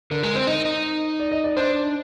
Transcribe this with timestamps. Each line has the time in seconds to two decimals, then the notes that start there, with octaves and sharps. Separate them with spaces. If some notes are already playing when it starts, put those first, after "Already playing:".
0.11 D3 A#4
0.23 G#3 A#4
0.35 C4 C5
0.47 D#4 D#5
0.65 D#4
1.20 D5
1.31 D#5
1.44 D5
1.57 D4 C5